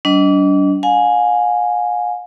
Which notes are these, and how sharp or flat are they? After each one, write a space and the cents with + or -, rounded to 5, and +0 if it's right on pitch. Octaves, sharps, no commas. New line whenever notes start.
G3 -45 D4 -35 D#5 +0
F5 +45 G#5 +0